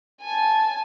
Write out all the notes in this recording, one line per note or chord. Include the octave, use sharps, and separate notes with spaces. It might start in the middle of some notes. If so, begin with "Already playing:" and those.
G#5 A5